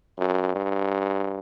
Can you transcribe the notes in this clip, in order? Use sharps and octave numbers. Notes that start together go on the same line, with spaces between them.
F#2
G2